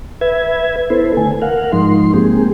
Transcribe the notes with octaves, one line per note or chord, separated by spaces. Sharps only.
B4 E5 G#6
B3 E4 A4 B4 C5
D3 A3 G#5
A#4 F5 F#5
G#2 F3 G#3 D#4 C6
G#3 A#3 C4 G4 G#4